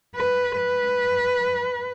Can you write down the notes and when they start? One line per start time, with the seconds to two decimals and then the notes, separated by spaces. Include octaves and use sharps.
0.16 B4
0.57 B4